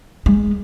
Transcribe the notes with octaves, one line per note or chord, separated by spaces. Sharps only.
G#3